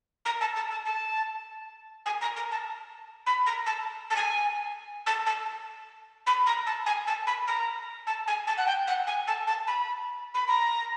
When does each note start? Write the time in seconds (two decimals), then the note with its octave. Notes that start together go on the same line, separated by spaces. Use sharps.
0.25 A#5
0.40 A5
0.55 A5
0.70 A5
0.85 A5
2.05 G#5
2.20 A#5
2.36 A#5
2.51 A5
3.26 B5
3.46 A#5
3.66 A5
4.10 A5
4.16 G#5
5.06 A5
5.26 A5
6.26 B5
6.46 A#5
6.66 A5
6.86 G#5
7.07 A5
7.26 B5
7.47 A#5
8.06 A5
8.27 G#5
8.47 A5
8.57 F#5
8.67 G5
8.87 F#5
9.07 G#5
9.27 A5
9.47 A5
9.67 B5
10.34 B5
10.47 A#5